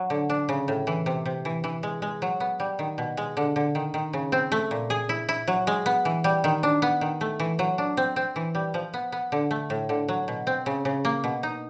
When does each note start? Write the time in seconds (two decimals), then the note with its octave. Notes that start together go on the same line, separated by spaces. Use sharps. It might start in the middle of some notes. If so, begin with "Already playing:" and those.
Already playing: F#3
0.10 D3
0.30 D4
0.49 C#3
0.68 A2
0.87 E3
1.06 C3
1.26 C3
1.45 E3
1.64 E3
1.83 G#3
2.02 G#3
2.22 F#3
2.40 B3
2.60 G3
2.79 D#3
2.98 B2
3.17 G#3
3.37 D3
3.56 D3
3.75 D#3
3.94 D#3
4.13 C#3
4.32 C4
4.52 A3
4.71 A#2
4.90 G#4
5.09 E4
5.29 E4
5.48 F#3
5.67 G#3
5.86 B3
6.05 E3
6.24 G3
6.44 D#3
6.63 D4
6.82 B3
7.01 D#3
7.21 A3
7.40 E3
7.59 F#3
7.78 D4
7.97 C4
8.16 C4
8.36 E3
8.55 G3
8.74 F3
8.94 B3
9.12 B3
9.32 D3
9.51 A3
9.70 A2
9.89 D3
10.09 F#3
10.28 B2
10.47 C4
10.66 C#3
10.85 C#3
11.05 A#3
11.24 B2
11.43 D#4